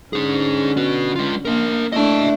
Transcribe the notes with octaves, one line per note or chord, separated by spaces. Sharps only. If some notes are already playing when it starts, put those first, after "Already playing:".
D3 C#4 D#4 G#4
B3 F#4
G#3 F4
A#3 D4 A#4
A3 D4 E4 D#5 A5